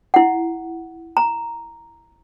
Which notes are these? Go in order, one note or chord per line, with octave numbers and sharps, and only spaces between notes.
E4 F#5
A#5